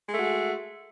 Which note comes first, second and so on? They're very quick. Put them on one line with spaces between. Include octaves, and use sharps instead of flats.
G#3 A3 F#4 G#4